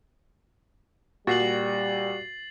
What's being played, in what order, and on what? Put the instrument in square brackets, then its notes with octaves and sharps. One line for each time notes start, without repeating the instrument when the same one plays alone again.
[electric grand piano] A#2 [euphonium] G3 [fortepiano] F#4 [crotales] A6 C7 F#7